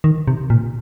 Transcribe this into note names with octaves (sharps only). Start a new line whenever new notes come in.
D#3
C3
A#2